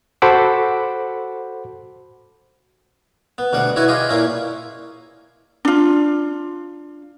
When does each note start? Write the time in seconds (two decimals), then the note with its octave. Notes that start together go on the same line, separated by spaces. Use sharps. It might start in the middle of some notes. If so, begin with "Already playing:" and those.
0.22 F#4 A4 C5 F#5 B5 D6
3.38 B3
3.53 D2 B2 G3 F#5
3.76 E4 F#4 B4 C#5
3.88 F4 G4 G#4 D#5
4.09 A#2 C#4 E4
5.65 D4 F4